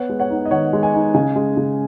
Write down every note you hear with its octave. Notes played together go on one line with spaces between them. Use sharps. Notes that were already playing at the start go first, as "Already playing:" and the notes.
Already playing: B3 C#5 F#5
G#3
C#5 F#5
D#4
D#5
D#3 C#5 F#5
G#3
D#5 G#5
D#4
C#3 D#5 G#5
G#3
C#3